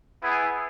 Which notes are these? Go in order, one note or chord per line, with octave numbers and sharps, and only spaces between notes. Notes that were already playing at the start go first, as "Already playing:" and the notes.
B3 E4 G#4